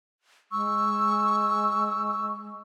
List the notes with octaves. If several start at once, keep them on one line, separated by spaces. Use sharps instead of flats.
G#3 C#6 E6